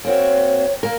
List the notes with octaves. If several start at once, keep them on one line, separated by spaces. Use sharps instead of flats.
A#3 C4 F#4 C#5
A#3 A#4